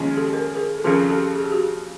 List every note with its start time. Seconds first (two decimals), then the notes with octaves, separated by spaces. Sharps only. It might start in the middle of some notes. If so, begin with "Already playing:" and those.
Already playing: D#2 C#3 F3 G#3
0.17 G4 A4
0.33 A#4
0.55 G#4 A#4
0.78 A4
0.84 F2 C#3 F3 G#4 A#4
1.02 G#4
1.10 G4 A4
1.35 G#4
1.44 G4
1.52 F#4 G#4